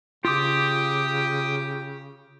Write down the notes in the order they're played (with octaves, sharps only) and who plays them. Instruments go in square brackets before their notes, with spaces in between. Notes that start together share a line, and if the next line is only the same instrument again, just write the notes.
[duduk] C#3 [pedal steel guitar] F4 D6 [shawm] G4 [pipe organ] G5 D#6